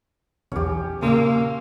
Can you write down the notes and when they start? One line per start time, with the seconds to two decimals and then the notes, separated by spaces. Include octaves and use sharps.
0.52 B1 E2 C#4 G4
1.02 A#2 C#3 A#3 C6 E6